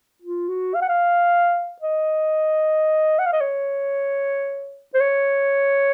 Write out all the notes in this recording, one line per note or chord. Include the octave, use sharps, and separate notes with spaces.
F4
F#4
F5
F#5
F5
D#5
F#5
F5
D#5
C#5
C5
C#5